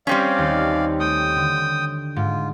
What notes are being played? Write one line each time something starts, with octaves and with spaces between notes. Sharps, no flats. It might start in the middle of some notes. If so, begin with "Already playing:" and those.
G3 C4 C#4 D5 F5
D#2 A5
A3 G5 D#6
D3
G#2 F4